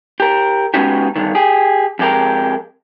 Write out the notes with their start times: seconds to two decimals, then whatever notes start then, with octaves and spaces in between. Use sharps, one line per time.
0.20 G4 A#4
0.74 G#3 B3 C#4 D#4 F#4 G4
1.16 G2 D3 D#3
1.35 G4 G#4
1.99 F2 G#3 G4 A#4